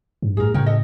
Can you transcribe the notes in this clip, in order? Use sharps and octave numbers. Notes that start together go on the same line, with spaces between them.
G2
A2 G#4 A#4
A2 C#3 A#4 C#5 G5
A4 D#5